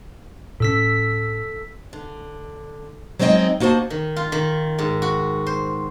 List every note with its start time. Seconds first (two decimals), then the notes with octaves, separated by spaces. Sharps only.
0.60 A2 C#4 A4 E6 B6
1.93 D3
3.19 F#3 G#3 C4 D#4 D#5 G5
3.60 A#3 D#4 F#4 C5 A5
3.90 D#3
4.16 F4
4.32 D#3
4.79 G#2
5.02 F#4
5.47 C5